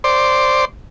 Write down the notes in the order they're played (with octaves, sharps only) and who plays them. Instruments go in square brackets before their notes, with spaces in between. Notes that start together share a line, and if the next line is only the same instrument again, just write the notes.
[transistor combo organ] C5 D5